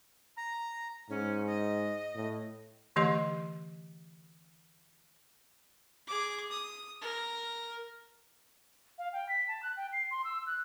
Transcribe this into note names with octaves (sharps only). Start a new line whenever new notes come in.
A#5
G#2 C#4
D#5
A2
D3 E3 A3 G4 D#5 C6
G#4 D6
D#6
A#4
F5
G5
B6
A5
F#6
G5
C7
C6
E6
F#6